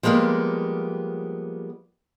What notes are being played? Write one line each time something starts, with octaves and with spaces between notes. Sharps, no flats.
F3 G3 G#3 A#3 B3